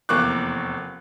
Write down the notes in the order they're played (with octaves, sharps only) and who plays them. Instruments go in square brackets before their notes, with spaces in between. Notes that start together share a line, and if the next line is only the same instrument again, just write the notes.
[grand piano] F1 E2 A#3 C#6 D6 F#6